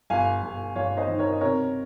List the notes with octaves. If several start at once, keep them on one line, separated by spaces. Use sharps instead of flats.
G1 F5 G#5
G1
G1 C#5 F5
C5 D#5
D#3
A#4 C#5
D#5
C3 A#4 C#5